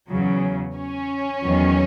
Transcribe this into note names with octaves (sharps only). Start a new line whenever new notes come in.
E2 C#3 F#3
C#4
E2 D#3 F#3